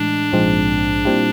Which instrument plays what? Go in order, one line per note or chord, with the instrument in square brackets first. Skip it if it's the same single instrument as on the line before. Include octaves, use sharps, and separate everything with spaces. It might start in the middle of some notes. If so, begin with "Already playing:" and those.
Already playing: [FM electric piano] A2 E3 G#3 [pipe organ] D4
[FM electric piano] A#1 G#2 F3 G#3 C4
A#2 G3 C4 E4 G4